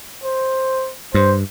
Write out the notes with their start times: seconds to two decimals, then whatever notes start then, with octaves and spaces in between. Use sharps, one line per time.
0.24 C5
1.14 G2 C5